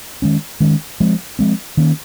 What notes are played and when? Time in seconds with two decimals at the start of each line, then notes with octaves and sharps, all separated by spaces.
0.22 D#3 G#3 C#4
0.60 D#3 G#3 C#4
1.00 F3 G#3 C4
1.39 F3 G#3 C4
1.77 D#3 A#3 C#4